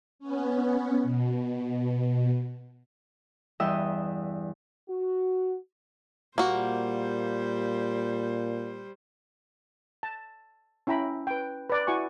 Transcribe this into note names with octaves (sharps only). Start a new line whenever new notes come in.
B3 C#4
B2
E2 G2 D#5 E5 G5 E6
F#4
A#2 G3 A#3 F#4 C5
A5
C#4 E4 G5 A#5 B5
B4 G5
B4 D5
E4 F#4 G#5 C#6